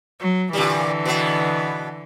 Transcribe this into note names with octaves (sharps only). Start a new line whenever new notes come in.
F#3
A#2 D3 E3 G3
B2 B3